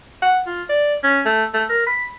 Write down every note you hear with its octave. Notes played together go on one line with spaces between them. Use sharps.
F#5
F4
D5
C#4
A3
A3
A#4
B5